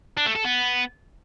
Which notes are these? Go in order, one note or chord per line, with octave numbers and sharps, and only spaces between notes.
D4
A3
A4
B3